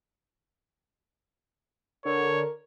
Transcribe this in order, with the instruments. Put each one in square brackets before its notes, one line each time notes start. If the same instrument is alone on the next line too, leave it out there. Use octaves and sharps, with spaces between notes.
[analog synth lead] D3 [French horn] A#4 [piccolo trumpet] C#5